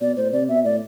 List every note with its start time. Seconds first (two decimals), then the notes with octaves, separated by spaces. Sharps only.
0.01 B2 D5
0.17 A2 C5
0.33 C3 D5
0.49 B2 E5
0.65 A2 D5